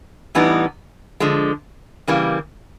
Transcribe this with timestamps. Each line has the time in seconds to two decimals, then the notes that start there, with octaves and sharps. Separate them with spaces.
0.35 A2 E3 G3 B3 D#4
1.20 D3 F3 G#3
2.07 C#3 E3 G3 A#3